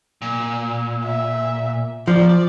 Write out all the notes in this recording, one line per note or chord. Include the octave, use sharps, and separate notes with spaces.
A#2
E5
F3 D5